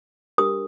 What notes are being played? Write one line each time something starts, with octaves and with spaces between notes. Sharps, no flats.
D4 G4 A#4 D#6